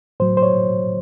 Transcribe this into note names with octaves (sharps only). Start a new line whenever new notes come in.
A2 F#3 C5
C5
C#5